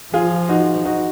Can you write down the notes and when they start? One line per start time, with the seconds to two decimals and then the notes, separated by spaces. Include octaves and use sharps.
0.13 F3 F4 G#4
0.49 D#4 F#4
0.85 D#4 F#4